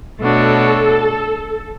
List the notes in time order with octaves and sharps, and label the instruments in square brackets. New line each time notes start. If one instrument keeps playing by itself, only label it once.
[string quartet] B2 A3 D4 F#4 C#5 [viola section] A4